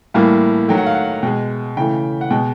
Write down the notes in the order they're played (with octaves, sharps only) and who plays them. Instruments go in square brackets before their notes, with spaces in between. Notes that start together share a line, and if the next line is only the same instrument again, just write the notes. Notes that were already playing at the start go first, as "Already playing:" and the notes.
[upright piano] A2 E3 G3 A#3 F5
D#3 F#3 A3 G5
F#5
F5
F#5
B2 G#3 G5
C#3 E3 A3 G5
F#5
B2 G#3 G5